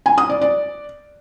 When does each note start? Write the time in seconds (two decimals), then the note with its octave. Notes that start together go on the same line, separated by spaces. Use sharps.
0.06 G#5
0.18 D#6
0.30 D5
0.41 D5